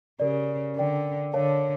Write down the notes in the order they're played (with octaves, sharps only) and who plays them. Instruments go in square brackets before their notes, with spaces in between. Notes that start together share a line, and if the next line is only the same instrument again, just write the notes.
[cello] C#3 [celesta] G4 A#4 D5
[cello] D3 [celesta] A#4 D5 G5
[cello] D3 [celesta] A#4 C#5 F5 A5